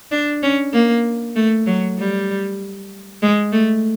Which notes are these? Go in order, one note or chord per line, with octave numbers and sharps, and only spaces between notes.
D4
C#4
A#3
A3
F#3
G3
G#3
A3